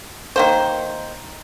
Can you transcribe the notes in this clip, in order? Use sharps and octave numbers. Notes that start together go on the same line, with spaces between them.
D#3 A#3 C5